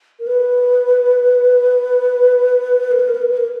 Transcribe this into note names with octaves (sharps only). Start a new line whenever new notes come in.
A#4
B4
A#4
B4
A#4
B4
A#4
B4
A#4